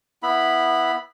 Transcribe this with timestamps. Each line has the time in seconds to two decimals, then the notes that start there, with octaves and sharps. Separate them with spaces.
0.23 B3 E4 B5